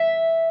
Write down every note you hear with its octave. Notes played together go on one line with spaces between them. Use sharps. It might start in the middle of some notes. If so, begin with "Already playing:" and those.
Already playing: E5